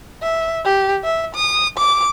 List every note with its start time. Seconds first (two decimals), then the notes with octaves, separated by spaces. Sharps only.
0.22 E5
0.65 G4
1.04 E5
1.35 D#6
1.78 D6